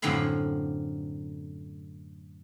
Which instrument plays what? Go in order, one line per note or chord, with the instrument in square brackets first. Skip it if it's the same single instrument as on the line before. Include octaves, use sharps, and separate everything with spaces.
[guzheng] F#2 A2 D3 C4 F5 B5